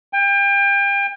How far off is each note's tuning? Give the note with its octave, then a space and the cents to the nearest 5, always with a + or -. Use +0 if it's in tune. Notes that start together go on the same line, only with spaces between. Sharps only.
G5 +35